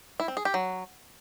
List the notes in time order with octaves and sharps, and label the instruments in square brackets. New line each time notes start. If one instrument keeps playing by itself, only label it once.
[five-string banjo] E4
C4
G#4
G4
F#3